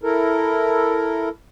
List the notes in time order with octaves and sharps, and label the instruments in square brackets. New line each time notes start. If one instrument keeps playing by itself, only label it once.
[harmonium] E4 A4 A#4